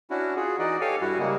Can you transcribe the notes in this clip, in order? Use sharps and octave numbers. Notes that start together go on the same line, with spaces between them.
C#4 D4 E4 F#4
F4 F#4 G#4
E3 D#4 F#4 D5 D#5
G4 A4 C#5 F5 G#5
G2 G3 E4 F#4
C#3 G3 G#3 A#3